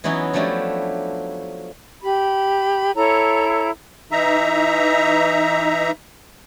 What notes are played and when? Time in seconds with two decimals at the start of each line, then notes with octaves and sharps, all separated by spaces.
0.04 E3 F#3 B3 C#4 D#4 E4
0.33 F3 F#3 A3 D4 E4 G4
2.03 G4 B5
2.95 E4 A4 C#5 A#5
4.12 E3 D#4 E5 A#5